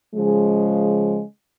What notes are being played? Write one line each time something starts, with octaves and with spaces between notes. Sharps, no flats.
C#3 F3 G#3